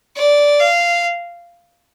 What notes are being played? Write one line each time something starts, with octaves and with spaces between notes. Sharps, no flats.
D5
F5